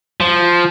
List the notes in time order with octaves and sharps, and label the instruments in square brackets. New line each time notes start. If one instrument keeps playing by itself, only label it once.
[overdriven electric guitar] F3